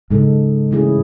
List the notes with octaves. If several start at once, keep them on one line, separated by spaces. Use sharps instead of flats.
G#2 C#3 G#3 D#4 A4
E3 A3 C#4 E4 G#4